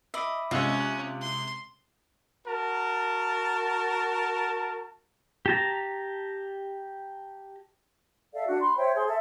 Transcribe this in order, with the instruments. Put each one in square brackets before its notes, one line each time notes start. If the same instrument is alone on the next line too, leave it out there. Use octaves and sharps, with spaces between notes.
[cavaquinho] D#5 [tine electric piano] E5 B5 D6
[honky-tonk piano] C3 G#3 [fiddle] C#4 [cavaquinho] F4 [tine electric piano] D#5 E6 F#6
[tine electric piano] F#6
[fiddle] C6
[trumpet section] F#4 A#4 A5
[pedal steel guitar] G4 A5 A#5
[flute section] A4 D5 E5 F5
D4 F#4
B5 C6
C5 C#5 E5 G5
G#4 C5 C6
A4 E5